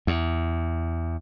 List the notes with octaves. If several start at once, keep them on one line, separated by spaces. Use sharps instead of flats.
E2